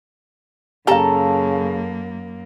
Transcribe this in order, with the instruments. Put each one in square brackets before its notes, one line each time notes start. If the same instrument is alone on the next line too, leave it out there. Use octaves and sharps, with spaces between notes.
[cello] F#2 A#3 [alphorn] C#3 [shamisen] G4 F5 [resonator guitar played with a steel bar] A4 A5 A#5